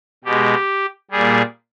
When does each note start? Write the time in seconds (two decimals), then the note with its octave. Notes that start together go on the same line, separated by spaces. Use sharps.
0.24 B2 G#3 G4
1.11 A#2 G3 G#4